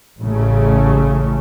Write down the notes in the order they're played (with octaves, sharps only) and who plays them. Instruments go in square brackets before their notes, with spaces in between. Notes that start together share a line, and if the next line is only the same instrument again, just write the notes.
[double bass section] A1 C#3 A3